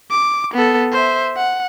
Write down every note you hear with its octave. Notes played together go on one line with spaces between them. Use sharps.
D6
B3 A4
C5 E5
F#5